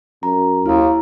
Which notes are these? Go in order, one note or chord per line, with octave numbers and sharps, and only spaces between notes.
F#2 A#5
D#2 E4 A#5